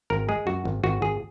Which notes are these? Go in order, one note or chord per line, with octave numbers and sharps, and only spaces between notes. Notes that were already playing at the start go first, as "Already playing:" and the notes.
G#1 A#4
G#3 G#4
F#2 F#4
G#1
G#1 F#4
G#1 G#4